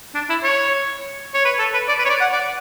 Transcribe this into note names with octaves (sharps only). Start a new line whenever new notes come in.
D4
E4
C#5
C#5
B4
A4
B4
D5
B4
C#5
D5
F#5
D5